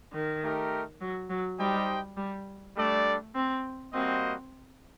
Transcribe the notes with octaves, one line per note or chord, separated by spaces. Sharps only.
D#3
A3 D#4 G4 A#4
F#3
F#3
G3 D#4 G4 C5 D#5 G5
G3
G3 A3 D4 A4 D5
C4
G3 A#3 C4 F#4 C5 D#5